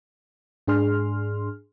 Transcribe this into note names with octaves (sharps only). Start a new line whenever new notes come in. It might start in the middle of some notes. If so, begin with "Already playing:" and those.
G#2 D4 G#4 C6 F6